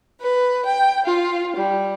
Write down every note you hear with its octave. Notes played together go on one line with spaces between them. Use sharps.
B4
G5
F4
G3